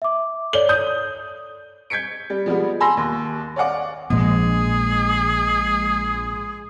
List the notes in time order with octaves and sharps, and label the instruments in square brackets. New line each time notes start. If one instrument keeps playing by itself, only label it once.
[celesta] E5 D6
[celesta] A4 C#5 D5 [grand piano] G7
[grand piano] D#6 G6
[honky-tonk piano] G6 G#6 B6 C#7 D7
G3
F3 G3 G#3 B3
G#5 A5 B5 C6 E6 A#6
D#2
C#5 D5 F5 F#5 D6
[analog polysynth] A#1 G#3 [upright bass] A#2 F3 [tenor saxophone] G#4